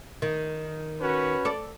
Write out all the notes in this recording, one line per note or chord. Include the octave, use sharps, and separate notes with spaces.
D#3
C#4 F#4 B4
A4 D5